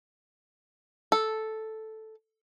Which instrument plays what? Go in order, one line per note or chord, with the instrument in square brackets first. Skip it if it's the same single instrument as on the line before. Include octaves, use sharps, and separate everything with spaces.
[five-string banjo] A4